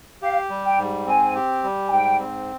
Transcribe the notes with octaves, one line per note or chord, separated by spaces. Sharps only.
G4 F5
G3
G5
G#2
C4 G#5
G4
G3
G#5
G#2 G5
C4